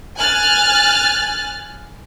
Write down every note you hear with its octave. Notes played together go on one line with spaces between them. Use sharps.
G#5 F6 F#6 A6